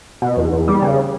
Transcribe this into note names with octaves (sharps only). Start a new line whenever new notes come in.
B2
E2
E2
G3
C#3